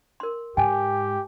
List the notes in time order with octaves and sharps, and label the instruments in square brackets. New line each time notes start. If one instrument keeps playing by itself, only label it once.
[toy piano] A#4 C6
[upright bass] G#2 [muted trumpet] G4 [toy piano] G5 G#5